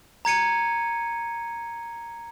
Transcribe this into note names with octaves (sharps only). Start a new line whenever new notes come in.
A#5 G#6 C#7 D#7